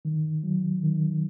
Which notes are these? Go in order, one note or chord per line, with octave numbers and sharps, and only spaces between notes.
D#3
F#3
D#3